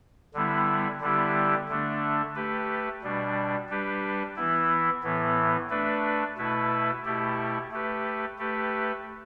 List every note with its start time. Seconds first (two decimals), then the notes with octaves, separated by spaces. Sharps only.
0.34 D3 G3 B3 E4
1.01 D3 G3 B3 E4 G4
1.69 D3 A3 D4
2.36 A3 G4 B4
3.02 B2 G3 D4
3.69 G3 D4 G4 B4
4.36 E3 B3 E4
5.03 A2 E3 B3
5.70 A3 D4 B4
6.37 B2 A3 E4 B4
7.05 B2 A3 E4 G4
7.72 A3 G4 B4
8.38 A3 G4 B4